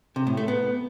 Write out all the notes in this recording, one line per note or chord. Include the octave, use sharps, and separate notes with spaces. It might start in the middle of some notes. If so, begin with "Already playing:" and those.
C3
A2
A3
B3